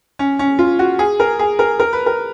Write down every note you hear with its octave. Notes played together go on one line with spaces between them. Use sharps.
C#4
C#4
F4
F#4
G#4
A#4
G#4
A#4
A#4
B4
A#4